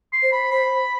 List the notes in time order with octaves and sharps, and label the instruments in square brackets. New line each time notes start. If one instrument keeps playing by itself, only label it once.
[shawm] C6
[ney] C5
[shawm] B5
[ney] C5 [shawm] B5